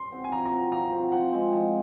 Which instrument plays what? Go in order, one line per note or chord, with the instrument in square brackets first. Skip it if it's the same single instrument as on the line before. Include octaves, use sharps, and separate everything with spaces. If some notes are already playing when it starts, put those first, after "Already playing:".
Already playing: [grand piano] C6
[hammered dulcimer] C4 F#4
[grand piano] G#5
[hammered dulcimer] F3 [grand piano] A#5
[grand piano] A#5
[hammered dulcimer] C4 F#4
[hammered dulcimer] F3 [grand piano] A#5
[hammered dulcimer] C4 F#4
[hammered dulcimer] F3 [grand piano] F#5
[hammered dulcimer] G#3 C4
F3